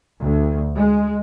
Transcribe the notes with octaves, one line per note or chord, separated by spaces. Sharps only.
D2
G#3